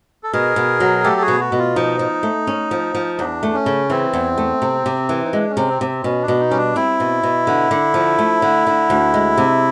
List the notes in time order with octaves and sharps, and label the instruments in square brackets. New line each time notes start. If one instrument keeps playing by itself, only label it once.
[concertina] A4
[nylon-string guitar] B2 [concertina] G#4 A#4
[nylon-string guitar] B2
F#3
[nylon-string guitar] A3 [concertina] G4 A4
[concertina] A4
F#4 G#4
[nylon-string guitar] B2
[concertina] F#4
[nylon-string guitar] B2
[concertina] F4
[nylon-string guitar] F3 [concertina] D#4
[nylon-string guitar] F3
A3
C#4
F3
F3
[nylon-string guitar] E2 [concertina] D4
[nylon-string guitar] A3
[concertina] C#4
[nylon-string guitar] C#3
[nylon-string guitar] E3 [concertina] C4
[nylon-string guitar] E2
A3
C3
C3
E3
[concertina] D#4
[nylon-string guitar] G#3 [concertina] D4
[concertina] C#4
[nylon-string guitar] C3
[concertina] C4
[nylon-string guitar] C3
[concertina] C4
[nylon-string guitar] B2 [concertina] C#4
[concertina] D4
[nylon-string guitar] B2
[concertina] D#4
[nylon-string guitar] G3 [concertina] C#4
[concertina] D4
[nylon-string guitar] C4 [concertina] E4
[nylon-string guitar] B2
B2
D3
D3
F3
A3
D3
D3
D2
G#3
C3